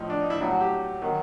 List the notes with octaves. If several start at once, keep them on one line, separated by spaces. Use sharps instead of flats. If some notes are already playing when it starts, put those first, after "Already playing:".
Already playing: A2 F3 D#4
D4
D#4
E4
A2 F#3 E4
F#4
G4
D#3 F#3